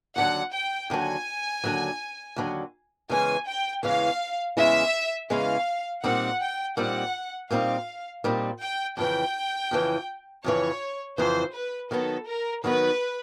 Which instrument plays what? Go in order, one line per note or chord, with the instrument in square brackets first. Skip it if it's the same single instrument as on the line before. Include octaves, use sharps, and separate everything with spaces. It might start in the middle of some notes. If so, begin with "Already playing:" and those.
[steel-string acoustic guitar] D#2 D3 F#3 [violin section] F#5
[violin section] G5
[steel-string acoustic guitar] D#2 D3 F#3 [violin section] G#5
[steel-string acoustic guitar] D#2 D3 F#3
D#2 D3 F#3
[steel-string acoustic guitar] E2 C#3 E3 G#3 C#4 [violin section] G#5
[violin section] G5
[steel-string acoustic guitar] E2 C#3 E3 G#3 C#4 [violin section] F5
[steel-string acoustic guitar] E2 C#3 E3 G#3 C#4 [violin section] E5
[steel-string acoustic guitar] E2 C#3 E3 G#3 C#4 [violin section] F5
[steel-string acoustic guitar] A#2 G3 C4 D#4 [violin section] F#5
[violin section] G5
[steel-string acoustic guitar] A#2 G3 C4 D#4 [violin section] F#5
[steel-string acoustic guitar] A#2 G3 C4 D#4 [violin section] F5
[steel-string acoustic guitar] A#2 G3 C4 D#4
[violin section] G5
[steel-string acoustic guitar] F2 C#3 E3 [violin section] G5
[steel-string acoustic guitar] F2 C#3 E3
[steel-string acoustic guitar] F2 C#3 E3 [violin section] C#5
[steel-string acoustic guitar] F2 C#3 E3 [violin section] C5
[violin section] B4
[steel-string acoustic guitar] D#3 F#3 B3 D#4 [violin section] A4
[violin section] A#4
[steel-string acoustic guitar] D#3 F#3 B3 D#4 [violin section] B4